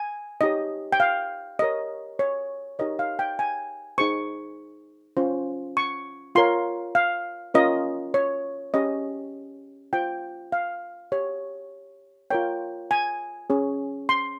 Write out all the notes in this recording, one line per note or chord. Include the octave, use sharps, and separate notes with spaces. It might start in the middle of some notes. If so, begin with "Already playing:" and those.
Already playing: G#5
D#4 G4 C#5 D#5
G5
F5
G4 A#4 C#5 D#5
C#5
D#4 G4 A#4 C#5 D#5
F5
G5
G#5
D#4 G#4 C5 C#6
C#4 F4 C5
C#6
F4 A#4 C#5 C6
F5
C#4 F4 A#4 C#5 D#5
C#5
C#4 G4 C#5 D#5
F4 C5 G5
F5
G4 C#5
F4 A#4 C#5 G5
G#5
C#4 G#4 C#5
C6